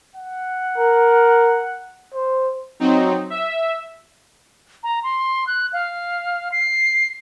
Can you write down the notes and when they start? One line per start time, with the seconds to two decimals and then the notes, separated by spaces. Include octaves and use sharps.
0.16 F#5
0.78 A#4
2.14 C5
2.80 F#3 C4 D#4
3.30 E5
4.83 A#5
5.03 C6
5.47 F#6
5.73 F5
6.52 C7